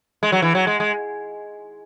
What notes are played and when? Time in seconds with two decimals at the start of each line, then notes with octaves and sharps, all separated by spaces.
0.23 G#3
0.32 F#3
0.42 E3
0.55 F#3
0.67 G#3
0.80 G#3